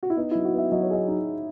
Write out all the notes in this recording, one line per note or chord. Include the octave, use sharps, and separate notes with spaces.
F#4
E4
B3 D#4
F#3 E4
F#4
B3 E5
F#3 D#5
C#5
G#4 D#5
D#4